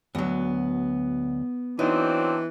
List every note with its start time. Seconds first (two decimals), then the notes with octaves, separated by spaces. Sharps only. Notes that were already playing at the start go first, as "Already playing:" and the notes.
0.15 D2 F#3 B3
1.79 E3 F#3 C4 D4 D#4